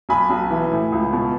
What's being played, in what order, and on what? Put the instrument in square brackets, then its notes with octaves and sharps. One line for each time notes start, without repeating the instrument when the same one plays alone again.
[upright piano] B1 G#5 B5
B1
E3
A2
C#2
B2